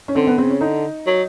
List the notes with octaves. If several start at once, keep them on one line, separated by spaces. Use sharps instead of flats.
C#4
D3 C4
B3
C#3 C4
C#4
D3 D#4
F#3